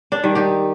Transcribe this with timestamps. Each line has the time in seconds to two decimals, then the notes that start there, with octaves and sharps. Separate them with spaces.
0.12 D4
0.24 D#3 G3
0.35 D#4 G4